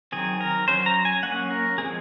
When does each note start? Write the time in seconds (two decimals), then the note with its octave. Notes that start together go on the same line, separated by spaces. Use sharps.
0.12 D#3 F#3 C4 G#4
0.41 A#4
0.68 F#3 C#4 C5
0.86 A#5
1.05 G#5
1.23 F#3 A#3 C#4 F#5
1.51 A#4
1.78 F3 G#3 C4 G#4